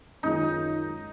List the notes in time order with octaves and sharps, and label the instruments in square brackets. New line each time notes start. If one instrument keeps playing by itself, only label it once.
[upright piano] F#2 D#3 G#3 C#4 F4 [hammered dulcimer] D#4